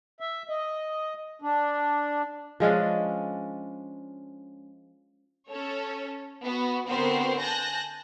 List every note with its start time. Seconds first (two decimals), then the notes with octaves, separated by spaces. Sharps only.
0.20 E5
0.49 D#5
1.42 D4
2.60 F3 G#3 C#4 D4
5.49 C#4 A4 C#5
6.43 B3 F#4
6.88 D3 B3 C4 F#4 A#4 C5
7.39 G#5 A5 F#6 G6 A#6